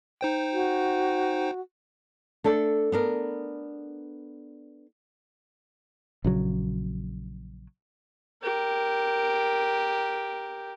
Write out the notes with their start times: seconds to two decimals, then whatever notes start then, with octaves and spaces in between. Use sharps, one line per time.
0.21 D#4 C5 G5
0.53 F#4
2.44 A3 D4 A4
2.92 B3 D4 A#4
6.24 A#1 C#3 F#3
8.43 G4 A#4